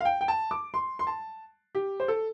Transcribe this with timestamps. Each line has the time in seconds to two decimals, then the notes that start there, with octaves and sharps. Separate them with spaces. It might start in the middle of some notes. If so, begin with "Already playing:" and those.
0.01 F5
0.05 G5
0.21 G5
0.28 A5
0.51 D6
0.74 C6
0.99 C6
1.07 A5
1.75 G4
2.00 C5
2.08 A4